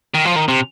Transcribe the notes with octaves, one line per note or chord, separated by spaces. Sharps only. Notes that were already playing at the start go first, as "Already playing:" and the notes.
D#3
F3
D#3
C3